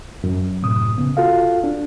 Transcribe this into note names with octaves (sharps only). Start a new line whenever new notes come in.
F#2
A2 C3 D#6
C#3 B3
F4 F#4 A4 F5
D4